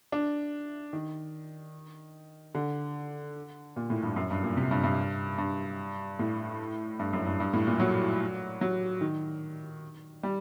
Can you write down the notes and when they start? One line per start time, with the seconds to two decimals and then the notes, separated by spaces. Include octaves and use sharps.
0.12 D4
0.93 D#3
2.55 D3
3.76 A#2
3.90 A2
4.03 G2
4.16 F#2
4.31 G2
4.43 A#2
4.57 C3
4.71 G2
4.84 G2
5.38 G2
6.19 A2
6.99 G2
7.13 F#2
7.26 G2
7.40 G2
7.53 A2
7.67 A#2
7.80 F#3
8.61 F#3
9.01 D#3
10.23 G3